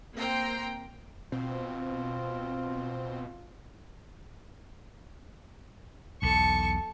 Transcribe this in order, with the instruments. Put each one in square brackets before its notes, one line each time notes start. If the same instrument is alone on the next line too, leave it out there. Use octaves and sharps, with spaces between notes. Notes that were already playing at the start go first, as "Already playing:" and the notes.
[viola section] A#3 C4 G5 A#5 C6
[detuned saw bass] B2 [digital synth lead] C4 [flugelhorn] F4
[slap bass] B1 E2 [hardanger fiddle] A4 C#6